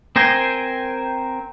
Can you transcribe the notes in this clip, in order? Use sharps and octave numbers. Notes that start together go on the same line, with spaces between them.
C4 A#4 C5 G5 G#5